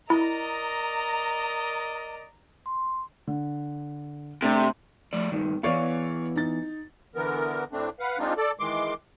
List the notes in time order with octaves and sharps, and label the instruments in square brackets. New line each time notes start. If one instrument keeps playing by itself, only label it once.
[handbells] E4 [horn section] A#4 D5 D#5 [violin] A#5
[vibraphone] C6
[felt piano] D3
[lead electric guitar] C3 [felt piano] A3 D4 A6
[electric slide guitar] F3 A3 D5
G2 D#3
[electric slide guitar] E3 B3 [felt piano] C#5 D5 F5
[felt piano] D#4 A6
[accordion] D3 E3 B3 A#4
A2 A3 C4 D4
B4 F5 F#5
G#3 C4 D4 D#4 F4
A4 D5
D#3 E3 G#3 C6 D6